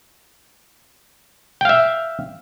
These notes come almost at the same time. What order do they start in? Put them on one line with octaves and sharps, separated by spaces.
G5 F5 E5